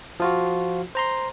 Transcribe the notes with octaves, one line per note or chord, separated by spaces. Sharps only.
F3 F4 F#4
C5 A#5 C6